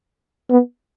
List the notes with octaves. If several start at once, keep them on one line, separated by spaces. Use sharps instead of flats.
B3